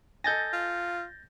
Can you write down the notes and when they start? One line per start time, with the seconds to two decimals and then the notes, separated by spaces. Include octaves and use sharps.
0.24 A4 D#5 G#5 G6 A6 A#6
0.53 F4